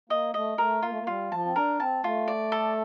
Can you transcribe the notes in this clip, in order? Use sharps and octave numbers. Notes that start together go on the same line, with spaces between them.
A#3 D#5
A3 D#5
A3 A#4
A#3 F4
A3
A#3
G3 F4
F3 A5
C4
D4 A#4
C4 A5
A3 F4
D5
A4